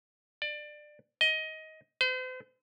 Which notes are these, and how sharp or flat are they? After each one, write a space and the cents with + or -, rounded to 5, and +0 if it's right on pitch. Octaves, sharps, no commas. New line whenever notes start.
D5 +20
D#5 +15
C5 -40